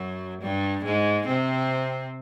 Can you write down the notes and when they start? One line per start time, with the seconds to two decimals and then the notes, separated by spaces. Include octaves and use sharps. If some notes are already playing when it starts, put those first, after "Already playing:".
Already playing: F#2 F#3
0.41 G2 G3
0.85 G#2 G#3
1.27 C3 C4